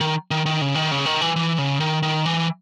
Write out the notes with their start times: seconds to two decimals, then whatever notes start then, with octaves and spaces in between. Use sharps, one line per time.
0.01 D#3
0.31 D#3
0.46 D#3
0.61 C#3
0.75 D#3
0.91 C#3
1.06 D#3
1.21 E3
1.36 E3
1.58 C#3
1.80 D#3
2.03 D#3
2.26 E3